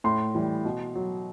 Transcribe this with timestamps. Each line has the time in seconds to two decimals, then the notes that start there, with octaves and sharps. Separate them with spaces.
0.04 A2 C6
0.35 E3 G3
0.65 B2
0.95 F#3